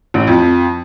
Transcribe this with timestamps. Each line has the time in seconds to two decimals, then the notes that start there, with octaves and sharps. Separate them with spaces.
0.14 A1
0.27 F2